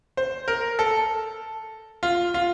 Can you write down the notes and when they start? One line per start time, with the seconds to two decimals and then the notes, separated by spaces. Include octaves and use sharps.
0.17 C5
0.48 A#4
0.79 A4
2.03 F4
2.34 F4